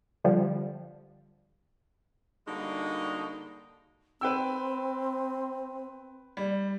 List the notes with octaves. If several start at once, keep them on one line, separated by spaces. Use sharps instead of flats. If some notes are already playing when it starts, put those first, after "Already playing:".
D3 F3 G3
D3 G3 G#3 A#3 D#4 F#4
C4 B4 G5 E6
G3